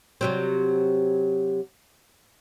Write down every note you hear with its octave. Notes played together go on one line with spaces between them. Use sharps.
C3 F#3 C4